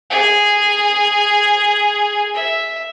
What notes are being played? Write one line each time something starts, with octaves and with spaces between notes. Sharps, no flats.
G#4
E5